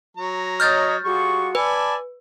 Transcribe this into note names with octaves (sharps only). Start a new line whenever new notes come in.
F#3 A#5
C#5 D#5 D#6 F6 G6 A6
G3 F4 F#4 G#4 C#6
B4 D5 G#5 A5 B5